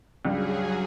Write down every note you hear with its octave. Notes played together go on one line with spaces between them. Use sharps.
C#2 G2 F#3 G3 G#4